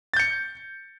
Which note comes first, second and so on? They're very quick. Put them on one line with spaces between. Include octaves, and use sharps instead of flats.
A6 G6 C#7